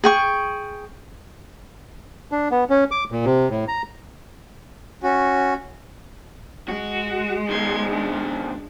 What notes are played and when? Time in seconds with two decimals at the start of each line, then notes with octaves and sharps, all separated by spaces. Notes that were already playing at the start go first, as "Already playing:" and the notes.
0.04 G#4 G5 C#6
2.32 D4
2.51 B3
2.70 C#4
2.91 D6
3.12 A#2
3.25 C3
3.50 A2
3.68 A#5
5.03 C#4 F#4
6.68 G#3 F#4
7.49 B2 D#3 C6 G#6
7.89 D4